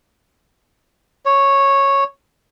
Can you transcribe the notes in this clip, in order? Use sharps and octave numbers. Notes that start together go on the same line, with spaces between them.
C#5